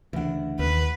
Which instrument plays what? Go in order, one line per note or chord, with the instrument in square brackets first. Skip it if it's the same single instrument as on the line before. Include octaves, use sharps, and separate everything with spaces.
[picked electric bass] D2 C#3 D4 [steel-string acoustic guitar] E3 F#5
[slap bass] D#2 [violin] B4